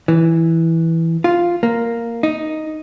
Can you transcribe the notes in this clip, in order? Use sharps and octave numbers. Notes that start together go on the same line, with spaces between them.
E3
F4
A#3
D#4